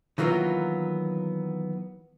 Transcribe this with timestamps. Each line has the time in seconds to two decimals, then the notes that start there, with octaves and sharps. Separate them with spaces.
0.18 D#3 E3 F#3 A#3 B3 F4